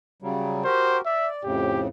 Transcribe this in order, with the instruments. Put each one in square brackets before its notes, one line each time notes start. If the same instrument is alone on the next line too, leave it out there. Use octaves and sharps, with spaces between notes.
[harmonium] C#3 F#3 G3
[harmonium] F#4 G4 A#4 [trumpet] C5
[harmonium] D5 [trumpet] E5
[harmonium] F2 A2 C#3 [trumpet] G4